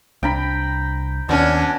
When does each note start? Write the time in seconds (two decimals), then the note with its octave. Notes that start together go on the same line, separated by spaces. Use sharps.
0.23 C2 D4 G5 A#5 B5
1.29 D#2 B2 C#4 D4 G#5